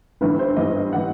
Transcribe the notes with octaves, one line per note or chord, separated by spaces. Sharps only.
G1 G2 E3 B4
C5
G1 G2 E3 D#5
E3 F#5